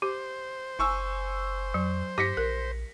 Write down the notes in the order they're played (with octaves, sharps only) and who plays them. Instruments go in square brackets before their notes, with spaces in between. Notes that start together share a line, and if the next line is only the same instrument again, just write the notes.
[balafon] G4 [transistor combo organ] C5
[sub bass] F#1 [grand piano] G#5 C#6 E6
[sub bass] F2 [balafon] F#3
[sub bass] G2 [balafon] G4 [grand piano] A#6 B6 C#7
[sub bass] A#1 [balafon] A#4